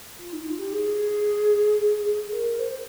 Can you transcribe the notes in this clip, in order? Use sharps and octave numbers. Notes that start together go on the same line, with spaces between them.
F4
D#4
F4
G4
G#4
A#4
C5